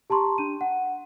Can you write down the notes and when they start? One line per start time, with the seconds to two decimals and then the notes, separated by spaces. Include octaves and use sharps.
0.10 G4 A5 A#5 C6 C#6
0.38 D4 D#7
0.61 F#5